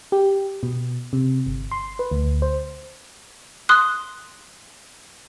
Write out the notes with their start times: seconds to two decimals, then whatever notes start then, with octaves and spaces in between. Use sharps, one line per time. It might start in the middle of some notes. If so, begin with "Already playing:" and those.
0.12 G4
0.63 B2
1.13 C3
1.46 G1
1.71 C6
1.99 B4
2.11 D2
2.42 C5
3.69 C6 D#6 F#6